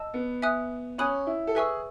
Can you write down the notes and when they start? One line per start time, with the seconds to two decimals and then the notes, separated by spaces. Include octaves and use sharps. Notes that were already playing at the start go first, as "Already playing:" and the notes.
Already playing: D#5 A5 E6
0.14 B3
0.42 E5 G#5 D#6 F#6
0.98 C#4 C#5 G#5 B5 D#6 F#6
1.27 E4
1.47 A4
1.55 G#4 B4 E5 G#5 C#6 E6